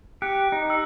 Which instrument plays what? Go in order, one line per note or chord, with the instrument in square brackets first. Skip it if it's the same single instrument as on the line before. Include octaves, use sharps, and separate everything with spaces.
[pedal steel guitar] G4 [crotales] F#6 C#7
[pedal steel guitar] D#4
[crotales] E6